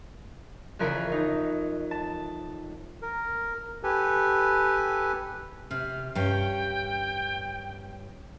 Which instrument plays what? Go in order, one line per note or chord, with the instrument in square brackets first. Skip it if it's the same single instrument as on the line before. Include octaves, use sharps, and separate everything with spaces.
[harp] F2 C#3 E3 A#4 C#5 A#5
D#4
A5
[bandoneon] A#4
G4 A4 B4 G#5
[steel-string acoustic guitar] C3 [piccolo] F6
[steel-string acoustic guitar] G2 C#4 [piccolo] G5